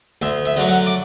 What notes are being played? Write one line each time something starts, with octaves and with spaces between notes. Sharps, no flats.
D2 E5
E5
D3 F#3
F#5
D5